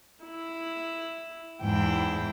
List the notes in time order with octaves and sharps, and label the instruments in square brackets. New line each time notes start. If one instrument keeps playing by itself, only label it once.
[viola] E4
[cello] E2 G#2 [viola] E4 G5